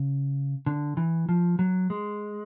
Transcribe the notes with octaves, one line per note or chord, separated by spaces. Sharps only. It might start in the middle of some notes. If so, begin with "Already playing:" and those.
Already playing: C#3
D3
E3
F3
F#3
G#3